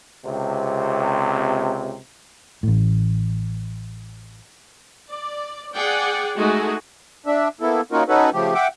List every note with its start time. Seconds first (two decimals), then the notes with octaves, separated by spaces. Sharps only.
0.24 C#2 C3
2.63 A1 A2
5.09 D5
5.74 G#4 D5 F#5 G5
6.37 G#3 A3 D#4 F#4 G#4
7.26 D4 E5
7.61 A#3 B3 E4 A4
7.92 A#3 C#4 D#4 F4 F#4 A#4
8.09 C#4 D#4 F#4 A4 B4
8.34 C#3 F3 A3 G4
8.55 E5 F#5 G5 D6